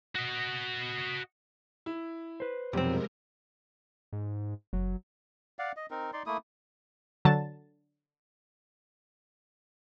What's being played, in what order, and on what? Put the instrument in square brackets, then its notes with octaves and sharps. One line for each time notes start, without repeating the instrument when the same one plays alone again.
[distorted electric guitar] F#4 D#5
[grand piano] E4
[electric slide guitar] B4 C5
[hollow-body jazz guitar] B1 C4 [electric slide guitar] F2 [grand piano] C3 G3 [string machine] F3 G#3 A#4
[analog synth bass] G#2
[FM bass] F#1 [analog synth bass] F#3
[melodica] D5 F5 F#5
D#5
C4 D#4 A#4
D#4 D5 C6
A3 A#3 E4 D#6
[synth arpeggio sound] D3 F#3 A5 A6